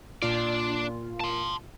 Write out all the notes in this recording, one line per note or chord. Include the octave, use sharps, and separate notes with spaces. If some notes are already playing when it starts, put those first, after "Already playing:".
A#2 D4 F4 D5
A5 C6